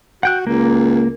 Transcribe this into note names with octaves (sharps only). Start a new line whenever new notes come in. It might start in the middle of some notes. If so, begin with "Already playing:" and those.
F#4 F#5 G5 F#6
C#2 A#3